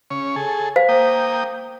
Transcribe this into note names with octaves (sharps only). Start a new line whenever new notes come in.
C#3 C#5
G#4 A4
C5 F5
A#3 G5 D#6